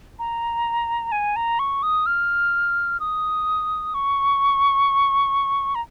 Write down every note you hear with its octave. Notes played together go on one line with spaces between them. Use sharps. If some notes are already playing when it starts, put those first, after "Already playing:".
A#5
G#5
A#5
C#6
D#6
F6
D#6
C#6
A#5